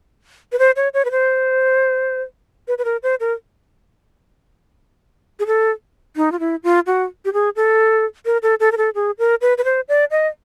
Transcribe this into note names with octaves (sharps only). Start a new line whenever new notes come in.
B4
C5
C#5
C#5
B4
C5
B4
B4
A#4
C5
A#4
G#4
A4
D#4
F4
E4
F4
F#4
G4
G#4
A4
A#4
A4
A4
A#4
A4
G#4
A#4
B4
B4
C5
D5
D#5